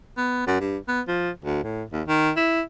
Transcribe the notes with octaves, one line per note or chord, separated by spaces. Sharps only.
B3
F#2
G2
B3
F3
D2
A2
D#2
D#3
E4